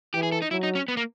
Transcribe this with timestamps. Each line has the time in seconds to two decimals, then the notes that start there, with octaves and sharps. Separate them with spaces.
0.14 E3 G4
0.23 G#4
0.32 A4
0.42 D#4
0.51 F#3 E4
0.63 D#4
0.75 C#4
0.88 B3
0.97 A#3